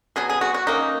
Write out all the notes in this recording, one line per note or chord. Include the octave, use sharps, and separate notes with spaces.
B2 F#3 B3 G#4
G#4
F#4
F#4
B2 A#3 C#4 D#4